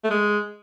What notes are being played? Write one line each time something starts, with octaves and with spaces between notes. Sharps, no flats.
A3
G#3